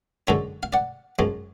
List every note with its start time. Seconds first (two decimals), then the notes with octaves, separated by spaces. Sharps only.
0.27 F#2 D3 G#3 A4 C#5
0.63 F5
0.73 D5 F#5
1.19 F#2 F3 G#3